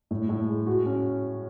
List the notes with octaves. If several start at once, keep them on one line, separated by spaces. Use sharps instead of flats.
A2
A2
G#3
F#4
C#4